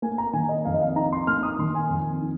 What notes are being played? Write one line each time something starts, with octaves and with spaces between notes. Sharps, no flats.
A#3 G#5
A#5
D#3 G#5
D#5
F2 F5
D#5
F5
D#4 A#5
C6
A#3 F6
D#6
D#3 C6
G#5
F2
D#4